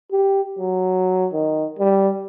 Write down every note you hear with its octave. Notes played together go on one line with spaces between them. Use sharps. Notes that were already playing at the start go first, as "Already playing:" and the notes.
G4
F#3
D#3
G3